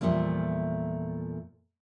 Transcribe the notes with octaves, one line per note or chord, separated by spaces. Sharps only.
E2 A#2 F3 G3 A3 A#3